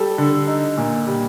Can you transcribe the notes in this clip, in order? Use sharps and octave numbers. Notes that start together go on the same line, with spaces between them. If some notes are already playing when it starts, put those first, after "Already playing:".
Already playing: G3 A4
D3
D#4
A#2
G3